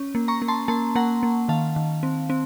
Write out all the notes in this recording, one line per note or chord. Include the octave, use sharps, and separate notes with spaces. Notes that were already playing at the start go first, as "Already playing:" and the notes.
Already playing: C#4
A#3
A#5 C#6
A#3
A5 C6
A#3 A5 C6
A#3 F#5 A#5
A#3
D#3 F5 A5
D#3
C4
C4